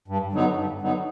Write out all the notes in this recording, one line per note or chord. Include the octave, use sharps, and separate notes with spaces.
G2
D3 F#3 B3 D#4
G2
D3 F#3 B3 D#4